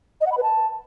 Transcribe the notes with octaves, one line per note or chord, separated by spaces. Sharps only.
D#5
F#5
B5
B4
A5